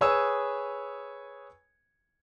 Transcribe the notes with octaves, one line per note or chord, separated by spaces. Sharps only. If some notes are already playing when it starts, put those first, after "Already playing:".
G#4 B4 C#5 G#5 D#6 E6